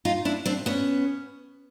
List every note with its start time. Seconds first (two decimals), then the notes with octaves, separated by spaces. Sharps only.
0.05 D#4 F4
0.25 D4 E4
0.46 C4 D4
0.66 B3 C#4